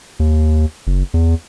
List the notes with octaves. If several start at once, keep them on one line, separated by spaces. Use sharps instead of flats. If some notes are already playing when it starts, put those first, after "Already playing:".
D#2
F#1
E2